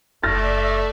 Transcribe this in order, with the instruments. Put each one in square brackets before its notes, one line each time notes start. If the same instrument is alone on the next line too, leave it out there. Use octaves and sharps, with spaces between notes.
[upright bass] F#1 [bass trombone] A3 [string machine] D5 E5 [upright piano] F6 A6 A#6